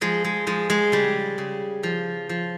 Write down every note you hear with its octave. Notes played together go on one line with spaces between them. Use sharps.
F3 G#3
G#3
F3 G#3
G#3
C#3 G3
C#3
F3
F3